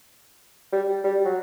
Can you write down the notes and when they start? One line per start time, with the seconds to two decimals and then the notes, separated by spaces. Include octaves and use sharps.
0.72 G3
1.04 G3
1.25 F#3